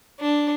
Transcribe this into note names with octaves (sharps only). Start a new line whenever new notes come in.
D4